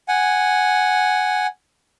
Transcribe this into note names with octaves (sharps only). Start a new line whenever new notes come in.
F#5 G#5